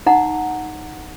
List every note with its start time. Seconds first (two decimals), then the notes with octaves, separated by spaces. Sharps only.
0.06 D#4 F#5 A#5